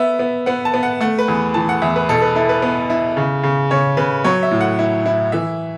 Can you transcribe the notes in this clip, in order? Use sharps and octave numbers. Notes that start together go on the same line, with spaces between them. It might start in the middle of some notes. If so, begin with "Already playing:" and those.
Already playing: B3 E5
B3
B3 F#5
A5
B3
F#5
A3 F#5
B4
E2
E3 A5
F#5
E2 E5
B4
B2 A4
B4
E4 A4
B4
B3
E4
C#3
C#3
C#3 C#5
C#3 B4
F#3 C#5
E5
A2
F#5
E4
E4
E3 E5